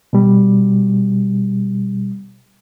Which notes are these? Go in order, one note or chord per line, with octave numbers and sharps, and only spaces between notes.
B2 G3